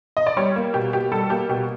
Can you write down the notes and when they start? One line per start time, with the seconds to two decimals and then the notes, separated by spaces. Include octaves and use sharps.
0.17 D#5
0.27 D5
0.37 G3 C#5
0.56 A#3
0.74 B2 G4
0.93 B2 G4
1.12 G3 A4
1.30 A#3 G4
1.49 B2 G4